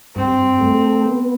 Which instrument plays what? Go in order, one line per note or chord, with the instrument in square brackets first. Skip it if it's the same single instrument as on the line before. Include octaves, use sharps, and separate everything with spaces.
[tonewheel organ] G2 [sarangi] C4
[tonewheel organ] A3
B3